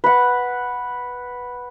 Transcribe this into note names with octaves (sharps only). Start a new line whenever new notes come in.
B4 F#5